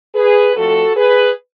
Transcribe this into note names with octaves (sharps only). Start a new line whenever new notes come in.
G#4 B4
F2 F3 A3 F#4 A4
G#4 B4